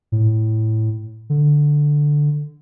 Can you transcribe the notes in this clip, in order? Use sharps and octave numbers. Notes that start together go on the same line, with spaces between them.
A2
D3